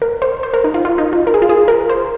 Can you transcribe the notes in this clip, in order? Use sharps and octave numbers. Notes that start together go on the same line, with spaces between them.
A#4
C5
C5
A#4
D#4
F4
F4
D#4
F4
A#4
G#4
F4
G#4
A#4
C5